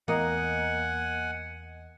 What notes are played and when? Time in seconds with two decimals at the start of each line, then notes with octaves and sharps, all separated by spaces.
0.08 E2 A#3 D#5 F#5 G#5